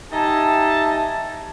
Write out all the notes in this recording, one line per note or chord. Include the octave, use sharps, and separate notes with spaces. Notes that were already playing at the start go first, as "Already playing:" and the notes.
D#4 G4 E5 G#5 A5